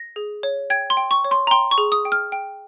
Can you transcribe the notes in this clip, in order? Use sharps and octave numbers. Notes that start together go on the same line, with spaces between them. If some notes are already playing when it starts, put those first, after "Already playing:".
Already playing: A#6
G#4
C#5
G5 G#6
C6
G5
C#6
C#5
C6
A#5
G5 C6
C#6
G#4
D#6
G5
F6
G5